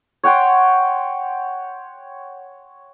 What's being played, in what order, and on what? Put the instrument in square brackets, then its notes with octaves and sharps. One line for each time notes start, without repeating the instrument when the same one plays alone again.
[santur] C#5 F#5 G5 C6